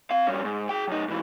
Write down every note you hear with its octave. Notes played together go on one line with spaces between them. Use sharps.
C4 F5
G2 C#4
G#2
G#4 G5
F#2 D#4
G#2 E3